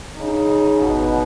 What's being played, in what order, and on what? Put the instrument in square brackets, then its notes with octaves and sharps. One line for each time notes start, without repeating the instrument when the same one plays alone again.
[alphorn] C#3 [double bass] D#4
[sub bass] G#1 [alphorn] B2